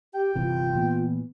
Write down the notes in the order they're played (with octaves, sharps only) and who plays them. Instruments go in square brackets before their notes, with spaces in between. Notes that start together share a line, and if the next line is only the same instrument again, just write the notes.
[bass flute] G4 [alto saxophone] G5
[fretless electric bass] G1 C3 E3 [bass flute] F4
[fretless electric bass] A#2 E3 B3